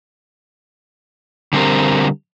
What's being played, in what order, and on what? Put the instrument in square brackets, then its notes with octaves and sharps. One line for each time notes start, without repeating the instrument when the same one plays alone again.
[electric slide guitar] D3 G3 C4 A#4